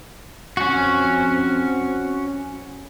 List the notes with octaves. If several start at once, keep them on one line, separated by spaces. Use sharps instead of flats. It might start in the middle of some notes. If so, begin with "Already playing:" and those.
F2 C4 C#4 F#4